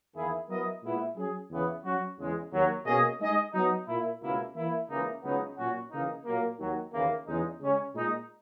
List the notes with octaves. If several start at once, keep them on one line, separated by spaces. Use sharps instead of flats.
E2 D#3 A#3 E4 G#4
F#3 B3 E4 A#4 D#5
A#2 G#3 B3 E4
F#3 C#4 G#4
E2 C#3 E3 B3
F#3 C#4 F#4
E2 C#3 G#3
D#2 D#3 F#3
B2 A#3 C#4 G#4 D#5
G#3 D#4 G#4 D#5
F#3 B3 D#4
A#2 A#3 E4
C#2 B2 A#3 E4
E3 A#3 E4
C#2 C#3 E3 A#3 D#4
C#2 C#3 F#3 B3 D#4
A#2 F#3 C#4 F#4
C#3 E3 A#3 D#4
A#2 F#3 A#3
D#2 D#3 F#3
D#2 C#3 E3 A#3
E2 C#3 G#3 D#4
C#3 G#3 C#4
A#2 G#3 D#4